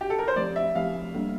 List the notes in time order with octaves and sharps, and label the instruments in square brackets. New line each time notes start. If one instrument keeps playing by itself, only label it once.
[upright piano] G4
A4
A#4
C5
[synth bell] F3 A3 C4 G4 [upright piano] D5
[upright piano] E5
[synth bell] F3 A3 C4 G4 [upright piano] F5
[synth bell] G3 A#3 D4 A4